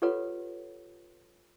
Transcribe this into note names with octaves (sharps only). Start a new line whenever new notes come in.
F4 G4 A4 B4 C#5 F#5